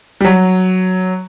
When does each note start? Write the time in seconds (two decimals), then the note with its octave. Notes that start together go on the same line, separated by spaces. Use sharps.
0.20 G3
0.25 F#3